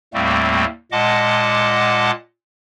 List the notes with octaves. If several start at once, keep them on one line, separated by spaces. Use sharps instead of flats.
D#2 A2 G3 A3 A#3 C4
A#2 G#3 D#5 F#5 A5 D6